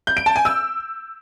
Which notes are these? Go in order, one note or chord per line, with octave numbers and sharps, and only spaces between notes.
G6
D7
A5
G#5
E6